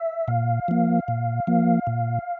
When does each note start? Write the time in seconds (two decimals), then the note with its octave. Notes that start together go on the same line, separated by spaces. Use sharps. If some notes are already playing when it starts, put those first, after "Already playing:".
Already playing: E5
0.28 A#2 F5
0.68 F3 A#3
1.08 A#2
1.47 F3 A#3
1.87 A#2